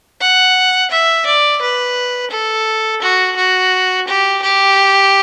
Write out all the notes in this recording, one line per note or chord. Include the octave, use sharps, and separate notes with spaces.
F#5
E5
D5
B4
A4
F#4
F#4
G4
G4